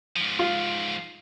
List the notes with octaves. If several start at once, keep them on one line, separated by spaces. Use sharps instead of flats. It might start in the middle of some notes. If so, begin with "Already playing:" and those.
G#2 F3
F4